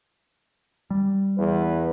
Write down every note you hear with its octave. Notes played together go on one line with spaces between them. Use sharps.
G3
E2 B4